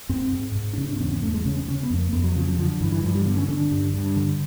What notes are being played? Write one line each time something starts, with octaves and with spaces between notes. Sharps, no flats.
G#2 C4
G#2
G#2
D4
C#3 C#4
D4
C4
E2 C#4
C#4
E2 A3
G#3
C#3 C#4
C#4
C#3 C#4
B3
F2
A#3
F2 B3
F#3
C#3 F3
F#3
D3 F3
G2 E3
E3
G2 F3
G3
D3 B3
C#4
D3 D4
G2
G2
D3